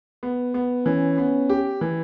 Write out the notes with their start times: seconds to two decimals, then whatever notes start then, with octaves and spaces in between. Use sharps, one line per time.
0.23 B3
0.54 B3
0.86 E3 C#4
1.18 B3
1.49 G4
1.81 E3